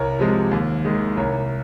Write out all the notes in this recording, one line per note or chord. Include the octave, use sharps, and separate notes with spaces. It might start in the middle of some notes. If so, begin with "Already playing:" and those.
Already playing: C2 A#4 C#5
C3 F3 G#3
D#2
D#3 G#3
C2 A#4 C#5